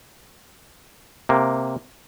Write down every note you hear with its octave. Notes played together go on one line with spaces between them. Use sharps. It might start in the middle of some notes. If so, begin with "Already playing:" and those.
C3 A#3